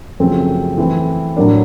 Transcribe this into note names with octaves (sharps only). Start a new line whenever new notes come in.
F#2 C#3 F3 A3 C4
E3 A3 C4
A2 F#3 A#3 D4